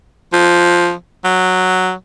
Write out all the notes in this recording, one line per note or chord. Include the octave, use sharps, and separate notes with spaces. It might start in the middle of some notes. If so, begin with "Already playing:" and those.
F3
F#3